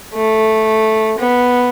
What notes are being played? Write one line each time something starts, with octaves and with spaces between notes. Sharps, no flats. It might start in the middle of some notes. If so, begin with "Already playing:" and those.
A3
B3